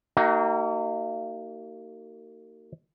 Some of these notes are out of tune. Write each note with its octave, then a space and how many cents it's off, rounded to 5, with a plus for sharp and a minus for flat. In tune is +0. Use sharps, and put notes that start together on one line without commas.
A#3 -35 D#4 +10 F#4 +40